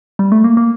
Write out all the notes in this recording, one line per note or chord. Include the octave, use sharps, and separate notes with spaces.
G3
A3
A#3
A#3